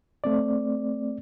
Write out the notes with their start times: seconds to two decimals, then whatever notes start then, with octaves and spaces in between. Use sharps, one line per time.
0.24 A3 C4 D5